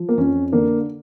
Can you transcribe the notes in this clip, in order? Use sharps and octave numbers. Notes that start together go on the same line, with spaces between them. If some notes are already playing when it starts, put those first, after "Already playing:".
Already playing: F3
A#3
F2 C#4
D3 A#3